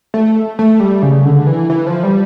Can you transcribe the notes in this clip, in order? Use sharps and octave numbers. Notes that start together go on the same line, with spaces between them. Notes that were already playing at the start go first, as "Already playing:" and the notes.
A3
A3
G3
C#3
D3
E3
E3
F3
G3